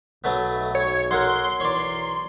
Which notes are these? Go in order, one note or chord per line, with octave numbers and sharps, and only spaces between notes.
B1 F#3 A3 B3
C#5
F#3 A#4 F#5 C6
B1 E3 A#4 C#5 D5